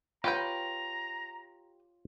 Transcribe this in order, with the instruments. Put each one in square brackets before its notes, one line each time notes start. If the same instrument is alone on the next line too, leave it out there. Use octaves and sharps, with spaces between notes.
[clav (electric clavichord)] F4 C#5 [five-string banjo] G4 B4 G5 [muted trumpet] A#5